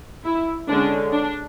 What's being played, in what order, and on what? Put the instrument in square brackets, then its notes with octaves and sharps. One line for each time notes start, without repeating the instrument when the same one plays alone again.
[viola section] E4
D3 G#3 C#4 D4
D4